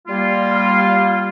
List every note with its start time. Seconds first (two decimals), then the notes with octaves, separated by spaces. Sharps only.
0.07 G3 A#3 F4